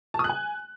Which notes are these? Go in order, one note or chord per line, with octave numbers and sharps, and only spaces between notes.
A5
D#6
F#6
G#5